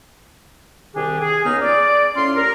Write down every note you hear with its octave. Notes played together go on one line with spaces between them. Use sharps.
C2 D#3 D4 G4 G#4
G#4
C#2 B3 D#4 A#4 F6
D5
A2 C#4 F4 C6
D4 G4 A#4